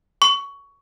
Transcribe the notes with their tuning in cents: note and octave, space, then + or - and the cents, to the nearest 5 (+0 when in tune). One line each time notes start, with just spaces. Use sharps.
C#6 +15